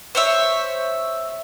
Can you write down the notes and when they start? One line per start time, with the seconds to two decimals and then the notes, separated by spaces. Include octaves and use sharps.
0.15 C5 C#5 E5